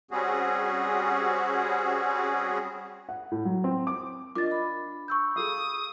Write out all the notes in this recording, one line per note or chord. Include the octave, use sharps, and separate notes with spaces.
G3 C4 C#4 F#4 G#4
F#5
A2
F#3
C4
D6
D4 F4 A#4 D#5 D6 A6
B5
C#6 E6 G6
G#4 A4 F5 D#6